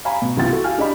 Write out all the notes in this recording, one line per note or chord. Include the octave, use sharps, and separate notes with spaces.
F5 G#5 A#5 B5
B2
C2 E3 F4 G5 A6
E4 F#4 A4
F5 G5 G#5 F6
D4 G4 D5 D#5 B5